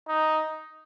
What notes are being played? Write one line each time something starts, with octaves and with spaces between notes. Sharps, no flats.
D#4